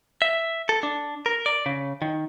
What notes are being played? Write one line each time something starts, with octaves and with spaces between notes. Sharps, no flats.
E5
A4
D4
A#4
D5
C#3
D#3